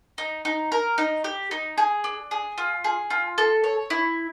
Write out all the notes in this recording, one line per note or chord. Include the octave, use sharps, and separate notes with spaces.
D#4
D#4
A#4
D#4
G4
D#4
G#4
D4
G#4
F4
G#4
F4
A4
C#5
E4